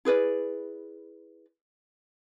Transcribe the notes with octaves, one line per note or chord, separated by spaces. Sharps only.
E4 G#4 B4 D5